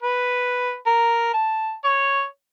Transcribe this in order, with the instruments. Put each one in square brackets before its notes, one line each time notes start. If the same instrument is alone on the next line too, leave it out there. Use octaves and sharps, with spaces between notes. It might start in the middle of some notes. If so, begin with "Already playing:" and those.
[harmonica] B4
A#4
A5
C#5